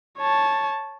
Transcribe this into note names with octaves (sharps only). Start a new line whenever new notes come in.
C#5 A5